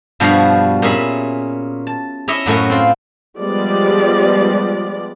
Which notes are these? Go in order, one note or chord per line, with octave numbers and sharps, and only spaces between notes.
G2 B2 F3 G3 F#4 F5
A#2 C#4 G#4 E5 B5
A5
C#4 E4 C#5 D#5 E5
F#2 A2 C#4 F#4
C4 F4
F3 G3 G#3 B3 D5